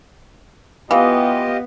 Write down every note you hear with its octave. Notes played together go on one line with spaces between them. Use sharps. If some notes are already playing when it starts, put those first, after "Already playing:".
E3 B3 F4 G4 D#5 F5